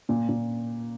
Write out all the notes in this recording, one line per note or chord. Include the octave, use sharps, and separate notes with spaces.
A#2
A#2